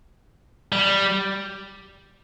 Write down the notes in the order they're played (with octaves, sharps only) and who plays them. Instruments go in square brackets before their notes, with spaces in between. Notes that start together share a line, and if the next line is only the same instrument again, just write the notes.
[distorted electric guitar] G3